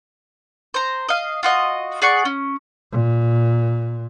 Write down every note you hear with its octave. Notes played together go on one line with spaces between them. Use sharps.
C5 A#5
D#5 F5
F4 F#4 D#5
G#4 D5 F#5 C#6
C#4
A#2